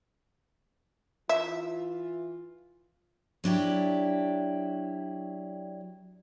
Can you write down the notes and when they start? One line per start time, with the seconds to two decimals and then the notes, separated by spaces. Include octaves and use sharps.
1.29 E3 F4 E5
3.44 F#3 D4 E4 G4